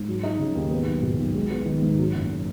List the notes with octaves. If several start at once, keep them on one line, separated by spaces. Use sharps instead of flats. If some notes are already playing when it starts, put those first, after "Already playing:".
Already playing: G#2
F#3
D#4
C#3
D#2
B3
B1
B2
B1
G#3
B3
D#3
G#2
F#3
F#1